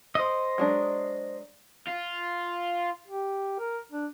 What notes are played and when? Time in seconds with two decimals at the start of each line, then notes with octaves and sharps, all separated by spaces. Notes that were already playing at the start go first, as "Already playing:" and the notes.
0.15 C5 D#5
0.58 F#3 G#3 D4
1.87 F4
3.08 G4
3.59 A#4
3.92 D4